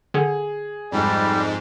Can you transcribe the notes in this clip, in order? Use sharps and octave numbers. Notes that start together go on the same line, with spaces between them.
D3 G#4
F2 G#2 G3 G#3